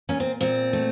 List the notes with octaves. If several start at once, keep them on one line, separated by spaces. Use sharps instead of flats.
A#2 C#4
C4
A#2 C4
A3